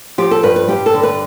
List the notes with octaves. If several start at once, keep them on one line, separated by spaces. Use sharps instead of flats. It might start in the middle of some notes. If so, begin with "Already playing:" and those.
F3 G4
A4
G2 B4
B4
G2 G4
A4
D3
B4